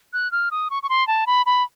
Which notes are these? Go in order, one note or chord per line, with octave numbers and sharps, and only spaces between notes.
F#6
F6
D#6
C#6
C#6
C6
A5
B5
B5